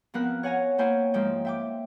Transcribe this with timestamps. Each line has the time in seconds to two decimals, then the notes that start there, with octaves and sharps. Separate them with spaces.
0.14 F3 B3 C4 A#4 F#6
0.43 C#5 F#5 G#5 A#5
0.78 A#3 E4 C5 C#5 G5 G#5
1.14 G#2 F3 G#3 G5
1.45 E5 G5 D6